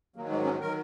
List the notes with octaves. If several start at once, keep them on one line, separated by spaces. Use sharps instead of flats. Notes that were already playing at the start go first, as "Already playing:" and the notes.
G#2 D#3 F#3 A#3
G#3
C#4
D#3 F#3 A#4